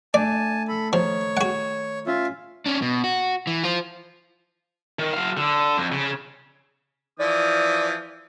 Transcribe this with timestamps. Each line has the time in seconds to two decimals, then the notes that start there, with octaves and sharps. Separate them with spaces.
0.14 A3 D4 D5 G#5 A5
0.69 A4 B5
0.93 D#3 F3 C#5
1.37 F#4 F#5
2.07 C#4 F4 E5
2.66 C#4 D4
2.82 B2
3.04 F#4
3.47 E3
3.64 F4 C5
4.99 D#3
5.13 F#3 F5
5.37 D3
5.78 F2
5.92 C#3
7.20 E3 F3 D5 D#6